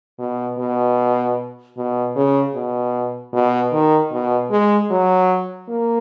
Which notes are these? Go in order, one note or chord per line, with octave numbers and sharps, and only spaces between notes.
B2
B2
B2
C#3
B2
B2
D#3
B2
G#3
F#3
A#3